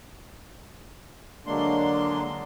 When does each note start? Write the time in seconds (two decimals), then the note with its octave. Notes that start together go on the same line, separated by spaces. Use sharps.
1.47 D3 F#3 G#3 A#3 D4 C6